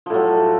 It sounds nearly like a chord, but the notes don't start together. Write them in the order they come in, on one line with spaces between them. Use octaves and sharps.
F3 A2 F#3